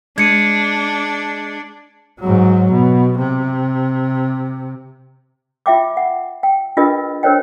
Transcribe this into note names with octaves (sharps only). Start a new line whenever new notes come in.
G#3 D4 G#6 C#7 D#7
G#2 F#3
B2
C3
F4 E5 G5 D6
F#5
G5
D4 F4 G#4 A#4 B4 D#5
D4 A#4 C5 C#5 D#5 G5